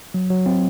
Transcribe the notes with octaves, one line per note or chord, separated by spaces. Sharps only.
F#3
F#3
C4